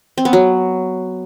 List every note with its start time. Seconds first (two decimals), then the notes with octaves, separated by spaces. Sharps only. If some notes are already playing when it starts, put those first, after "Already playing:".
0.18 C4
0.25 B3
0.33 F#3